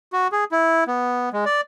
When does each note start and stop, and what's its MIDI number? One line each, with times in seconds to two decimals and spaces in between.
0.13 0.28 66
0.32 0.44 68
0.52 0.84 64
0.87 1.29 59
1.33 1.45 56
1.46 1.61 74